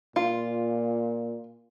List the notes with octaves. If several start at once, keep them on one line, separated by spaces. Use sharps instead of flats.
A#2 F4